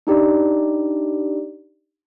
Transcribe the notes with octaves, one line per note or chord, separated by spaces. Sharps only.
D4 D#4 G4 D5